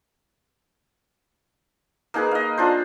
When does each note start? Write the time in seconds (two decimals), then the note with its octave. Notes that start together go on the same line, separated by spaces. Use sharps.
2.14 A#3 D#4 G#4 B4
2.31 D#5 F5
2.58 D4 F4 C5